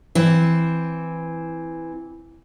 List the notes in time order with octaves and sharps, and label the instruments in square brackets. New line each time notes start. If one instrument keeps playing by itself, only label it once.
[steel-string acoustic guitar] E3 C4